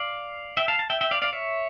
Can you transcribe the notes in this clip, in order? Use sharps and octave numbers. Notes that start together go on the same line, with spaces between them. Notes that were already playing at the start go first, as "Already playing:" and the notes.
Already playing: D5 F5
E5 G5
F5 A5
A5
E5 G5
E5 G5
D5 F5
D5 F5
C#5 E5